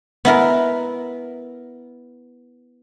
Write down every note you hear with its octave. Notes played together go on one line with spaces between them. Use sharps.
B3 E4 A#4